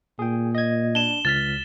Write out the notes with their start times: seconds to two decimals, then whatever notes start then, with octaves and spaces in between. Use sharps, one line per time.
0.19 A#2 G#4 G5
0.55 D#5 G#6
0.95 D4 E7 G7
1.25 C#2 F6 A6 B6